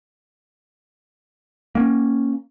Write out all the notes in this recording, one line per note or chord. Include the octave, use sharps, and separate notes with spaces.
A#3 C#4